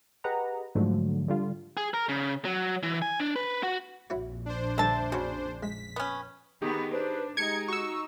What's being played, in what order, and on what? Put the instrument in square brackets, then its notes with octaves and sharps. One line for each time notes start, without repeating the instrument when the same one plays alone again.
[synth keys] G4 G#4 B4 D#5 F#5 A#5
G#2 D3 F3 F#3 A3
D3 G3 F4
[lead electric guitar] G#4
A#4
C#3
F#3
E3
G#5
D4
B4
F#4
[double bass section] A#1 F2 A#2 [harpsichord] E4 F#4 C#5
[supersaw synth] D4 C5
[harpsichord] G2 D3 [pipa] E5 A5
[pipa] C#3 [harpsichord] F#4 C#5
[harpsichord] G#3 [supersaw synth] B6
[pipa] B3 C#4
[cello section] D#3 B3 [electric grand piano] D#4 G4 G#4
[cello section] D4 [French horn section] B4 C5
[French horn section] G#3 G4 [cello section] D#4 [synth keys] G#6 C#7 [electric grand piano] D7
[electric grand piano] F#4 [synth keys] C#6 E6